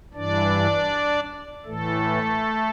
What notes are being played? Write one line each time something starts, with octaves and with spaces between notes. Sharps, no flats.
G2 E3 D4 D5
A2 E3 A3 A4